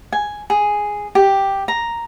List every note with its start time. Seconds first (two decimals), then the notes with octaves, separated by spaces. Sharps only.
0.13 G#5
0.50 G#4
1.15 G4
1.68 A#5